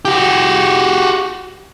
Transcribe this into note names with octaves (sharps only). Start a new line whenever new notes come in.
F#4 G4